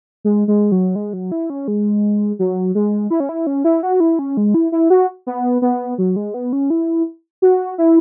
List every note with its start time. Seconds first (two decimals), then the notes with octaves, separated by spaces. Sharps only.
0.24 G#3
0.48 G#3
0.72 F#3
0.96 G#3
1.13 F#3
1.32 E4
1.50 C#4
1.68 G#3
2.39 F#3
2.75 G#3
3.10 E4
3.20 C#4
3.29 E4
3.47 C#4
3.64 E4
3.83 F#4
4.00 E4
4.19 C#4
4.37 G#3
4.54 E4
4.72 E4
4.90 F#4
5.27 B3
5.62 B3
5.98 F#3
6.16 G#3
6.34 B3
6.53 C#4
6.70 E4
7.42 F#4
7.78 E4